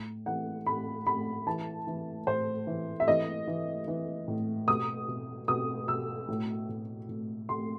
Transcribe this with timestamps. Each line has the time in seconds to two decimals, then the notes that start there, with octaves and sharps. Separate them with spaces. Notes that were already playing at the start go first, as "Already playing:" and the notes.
Already playing: A2
0.26 E3 F#5
0.66 A2 B5
1.06 A2 B5
1.47 E3 A5
1.87 E3
2.27 A2 C5
2.67 E3
3.00 E5
3.08 E3 D#5
3.47 E3
3.88 E3
4.28 A2
4.68 B2 D#6
5.08 B2
5.48 B2 D#6
5.88 B2 E6
6.28 A2
6.69 A2
7.09 A2
7.49 A2 C6